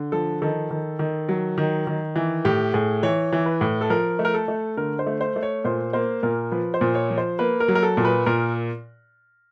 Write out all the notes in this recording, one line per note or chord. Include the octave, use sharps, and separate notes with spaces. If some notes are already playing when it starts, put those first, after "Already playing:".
Already playing: D3
F3 A4
D#3 A4
D#3
D#3
F#3
D#3
D#3
E3
A2 G4
A2 G#4
E3 C#5
E3
B4
A2
A4
F3 A#4
A3
A#4
A4
A3
D3 A#4
C5
A3
C5
A3
C#5
A#2 C5
A#3 C5
A#2 A#4
F3 B4
C5
A#2
C#5
F3
C5
A#3 B4
A#4
F#3
A#4
A4
A#2
B4
A#2 A#4